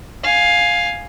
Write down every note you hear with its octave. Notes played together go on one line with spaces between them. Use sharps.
F5 G#5